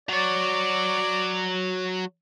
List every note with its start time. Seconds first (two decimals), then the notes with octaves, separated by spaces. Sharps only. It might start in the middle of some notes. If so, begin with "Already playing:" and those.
0.09 F#3 C#5 D5